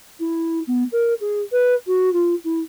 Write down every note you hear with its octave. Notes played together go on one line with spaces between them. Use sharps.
E4
B3
A#4
G#4
B4
F#4
F4
E4